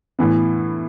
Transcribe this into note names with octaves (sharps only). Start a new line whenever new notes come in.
A2 E3 B3